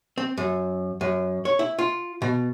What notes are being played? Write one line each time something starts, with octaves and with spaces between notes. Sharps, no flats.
C4
F#2
F#2
C#5
E4
F4
B2